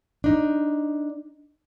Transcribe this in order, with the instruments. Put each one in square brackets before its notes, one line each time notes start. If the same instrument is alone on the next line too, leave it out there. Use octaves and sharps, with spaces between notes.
[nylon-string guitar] D4 D#4